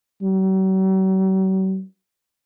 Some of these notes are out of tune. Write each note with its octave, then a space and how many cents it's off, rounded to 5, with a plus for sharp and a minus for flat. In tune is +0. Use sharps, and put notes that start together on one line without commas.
F#3 +45